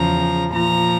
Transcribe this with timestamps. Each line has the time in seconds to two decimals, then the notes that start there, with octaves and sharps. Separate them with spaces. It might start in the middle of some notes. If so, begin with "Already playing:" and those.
Already playing: E2 C#3 F3 A#5
0.54 A#2 F3 A#5